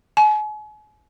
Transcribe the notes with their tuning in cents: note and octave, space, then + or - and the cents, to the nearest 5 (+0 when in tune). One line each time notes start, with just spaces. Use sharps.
G#5 +40